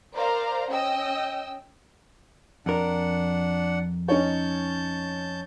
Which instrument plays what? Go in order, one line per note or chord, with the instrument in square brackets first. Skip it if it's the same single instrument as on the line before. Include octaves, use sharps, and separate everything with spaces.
[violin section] A#4 C5 D5 F5 A#5
C#4 D#5 G5 E6
[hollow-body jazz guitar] F2 A#4 [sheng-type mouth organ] D4 F#5
[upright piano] C#4 D#4 C#5 [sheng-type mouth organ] A5 G6